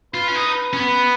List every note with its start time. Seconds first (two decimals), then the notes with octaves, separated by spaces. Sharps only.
0.14 F4 B4
0.28 C#4
0.36 D#4
0.47 B4
0.73 C#4
0.79 B3 B4